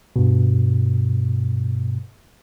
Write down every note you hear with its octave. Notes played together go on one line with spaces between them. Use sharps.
G2 B2